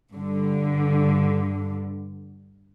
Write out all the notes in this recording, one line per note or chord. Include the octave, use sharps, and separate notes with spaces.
G2 D3